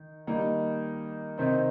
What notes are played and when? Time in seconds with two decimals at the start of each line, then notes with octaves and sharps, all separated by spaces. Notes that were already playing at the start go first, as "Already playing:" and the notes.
Already playing: D#3
0.27 D#3 G3 A#3 D#4
1.38 C3 D#3 C4 D#4